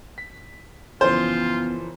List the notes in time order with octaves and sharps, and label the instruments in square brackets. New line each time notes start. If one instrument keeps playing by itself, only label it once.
[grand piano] B6
[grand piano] F#1 E3 F3 [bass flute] B3 [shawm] F4 [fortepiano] C5